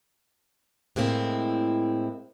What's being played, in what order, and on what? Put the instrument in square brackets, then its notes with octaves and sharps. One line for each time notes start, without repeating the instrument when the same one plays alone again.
[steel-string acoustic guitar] A2 G#3 A#3 C4 E4